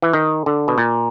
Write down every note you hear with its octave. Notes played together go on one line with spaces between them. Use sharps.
E3
D#3
D3
B2
A#2